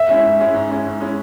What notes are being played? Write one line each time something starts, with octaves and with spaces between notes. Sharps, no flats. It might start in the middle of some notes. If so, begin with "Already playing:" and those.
Already playing: E5
G#3 C#4 E4
G#2
G#3 C#4 E4
G#2
G#3 C#4 E4
G#2
G#3 C#4 E4